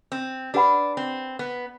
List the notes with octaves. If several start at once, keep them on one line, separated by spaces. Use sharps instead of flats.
C4
D4 G4 B4 F#5 B5
C4
B3